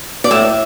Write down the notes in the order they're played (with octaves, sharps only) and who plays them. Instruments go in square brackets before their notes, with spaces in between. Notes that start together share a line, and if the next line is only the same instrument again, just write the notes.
[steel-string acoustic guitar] D5
A2 E5